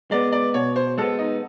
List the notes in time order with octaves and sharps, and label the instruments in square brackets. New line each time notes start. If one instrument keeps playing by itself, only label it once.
[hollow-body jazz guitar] G#3 B3 [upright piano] D5
[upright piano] D5
[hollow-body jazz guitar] B2 [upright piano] C#5
[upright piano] C5
[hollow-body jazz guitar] G#3 B3 [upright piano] A4
[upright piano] D#4